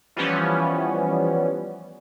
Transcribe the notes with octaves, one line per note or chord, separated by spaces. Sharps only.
E3 F3 G3 B3 C#4